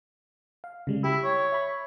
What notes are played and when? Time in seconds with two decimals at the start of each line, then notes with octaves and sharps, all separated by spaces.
0.64 F5
0.87 C#3 G3 G#3
1.04 E4 G4
1.24 C#5
1.52 E5 B5